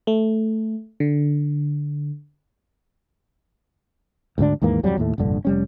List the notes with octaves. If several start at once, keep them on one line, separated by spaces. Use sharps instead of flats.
A3
D3
D2 G#2 D3 D4
D#2 G#2 E3 A#3
D1 F2 F#3 G3
D#2 A2 A3
F1 A#1 G2 D3
F1 G3 C#4